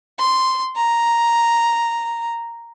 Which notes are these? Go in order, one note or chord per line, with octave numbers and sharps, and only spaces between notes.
C6
A#5